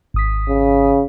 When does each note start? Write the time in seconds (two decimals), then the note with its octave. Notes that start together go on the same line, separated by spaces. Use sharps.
0.14 G#1 D#6 B6
0.49 C#3